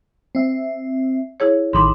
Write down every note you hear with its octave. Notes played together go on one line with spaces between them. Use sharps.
C4 E5
E4 G#4 C#5
A1 D#3 B5 C6 D6